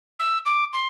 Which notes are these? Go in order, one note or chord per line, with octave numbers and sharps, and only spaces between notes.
E6
D6
C6